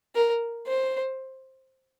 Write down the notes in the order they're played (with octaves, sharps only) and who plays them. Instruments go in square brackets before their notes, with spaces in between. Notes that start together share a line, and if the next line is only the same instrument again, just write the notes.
[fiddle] A#4
C5